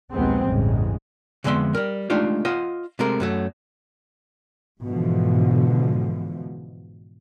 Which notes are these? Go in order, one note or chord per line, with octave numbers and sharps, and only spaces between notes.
A#1 D#2 F3 G#3 B3 C4
A1 E2 G2 C#3 G#3
F2 D3 G#3 B3 E5 C6
G3 A#4
G#3 A3 D4 D#4 F4 G4
F4 C5 D#5 F#5
C3 G#3 A3 A#4
F#2 F#3 A3
G#2 B2 D3 E3 F3